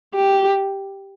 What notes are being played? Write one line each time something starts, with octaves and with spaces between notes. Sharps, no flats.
G4